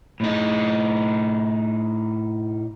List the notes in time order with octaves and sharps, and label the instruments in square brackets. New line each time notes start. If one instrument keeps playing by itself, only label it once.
[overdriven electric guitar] A2 D#4